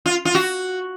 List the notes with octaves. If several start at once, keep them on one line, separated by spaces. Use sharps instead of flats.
F4
F4
F#4